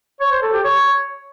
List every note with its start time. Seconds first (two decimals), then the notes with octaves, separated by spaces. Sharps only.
0.20 C#5
0.31 C5
0.42 A4
0.53 G4
0.64 C#5